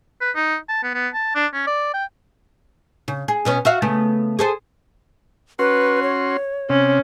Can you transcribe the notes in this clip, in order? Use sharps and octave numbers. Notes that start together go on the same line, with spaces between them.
B4
D#4
A5
B3
B3
A5
D4
C#4
D5
G5
C#3
G#4
B2 B3 C#4
F#4 E5 F5
C#3 A3 B3
G#4 A4 C5
C#4 F#4 B4 C6
C#5
C3 C#4